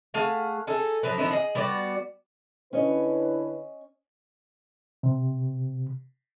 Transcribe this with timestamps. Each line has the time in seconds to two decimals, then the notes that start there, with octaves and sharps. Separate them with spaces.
0.14 A3 G#4 F5 F#5
0.67 D#4 G#4 A4
1.03 F3 F#3 B4
1.18 F3 B3 D#4 E4
1.31 G#4 D#5
1.55 G3 B3 F#4 D5
2.73 D3 C#4 E4 B4 C#5 D#5
5.03 C3